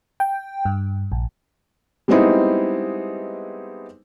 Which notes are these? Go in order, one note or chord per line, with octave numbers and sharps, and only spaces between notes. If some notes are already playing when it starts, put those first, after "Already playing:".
G5
G2
A#1
G3 G#3 B3 C4 D#4 E4